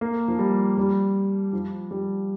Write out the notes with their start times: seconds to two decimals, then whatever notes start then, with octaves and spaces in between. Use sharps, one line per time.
0.01 A#3
0.28 F3
0.39 G3
0.78 G3
1.53 F3
1.91 G3